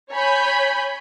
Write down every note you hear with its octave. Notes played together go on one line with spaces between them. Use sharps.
C#5 G#5 B5 G6